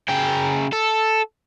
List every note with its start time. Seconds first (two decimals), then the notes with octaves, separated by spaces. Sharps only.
0.09 C#3 G5
0.73 A4